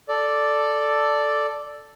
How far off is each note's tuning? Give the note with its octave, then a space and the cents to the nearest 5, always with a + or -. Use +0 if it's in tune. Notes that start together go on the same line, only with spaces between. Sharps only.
A4 +0 D5 +0